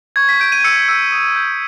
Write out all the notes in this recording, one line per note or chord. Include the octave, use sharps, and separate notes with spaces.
C#6 G#6
B6
G6 D7
D#7
E6 C#7
E6
D#6
G6